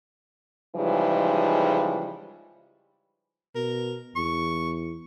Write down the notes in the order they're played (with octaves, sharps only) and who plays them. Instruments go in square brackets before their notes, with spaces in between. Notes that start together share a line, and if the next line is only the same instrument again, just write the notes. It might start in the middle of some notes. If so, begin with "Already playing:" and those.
[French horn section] C#3 E3 F3 G3 G#3 D#4
[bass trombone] B2 [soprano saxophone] A#4
[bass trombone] E2 [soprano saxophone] C#6